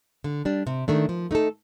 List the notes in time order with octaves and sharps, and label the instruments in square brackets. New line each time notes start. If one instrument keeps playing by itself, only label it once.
[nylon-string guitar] D3
G3 D4
C3
D#3 A3 D4
F3
A3 D#4 A4